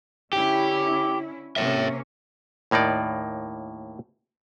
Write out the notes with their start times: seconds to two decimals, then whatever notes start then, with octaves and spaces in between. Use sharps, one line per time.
0.33 D3 C#4 E4 G4
1.56 C3 A#3 C#4 C#5 E5
2.71 D#2 A2 A#3 D#4 D5